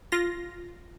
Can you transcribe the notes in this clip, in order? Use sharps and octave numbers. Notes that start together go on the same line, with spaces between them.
F4 A#6